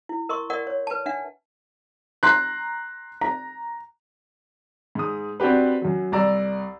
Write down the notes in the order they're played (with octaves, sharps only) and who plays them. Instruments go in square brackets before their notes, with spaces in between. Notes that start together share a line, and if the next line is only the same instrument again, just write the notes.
[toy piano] E4
A#4 D#5 C6 C#6
A#4 D5 D#5 F#5
C#5
B4 A5
D4 E5 F#5
[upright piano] A#5 C6 F#6
A#5
[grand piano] G#2 D#6
C4 D4 F#4 G4 B4
F#2 F#3
C2 D5 A#5 E6